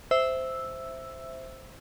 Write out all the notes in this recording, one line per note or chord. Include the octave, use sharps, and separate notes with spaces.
C5 E5 E6